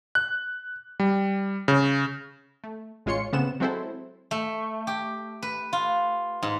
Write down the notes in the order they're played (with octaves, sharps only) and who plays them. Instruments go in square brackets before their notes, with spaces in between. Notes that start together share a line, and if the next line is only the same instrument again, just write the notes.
[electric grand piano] F#6
G3
C#3
[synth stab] A3
A1 G#3 F4 C#5 C6 C#7
A2 C#3 B3 C4 E7
F#3 G#3 C4 E4 A4 C5
[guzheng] A3
G4
B4
F4
G#2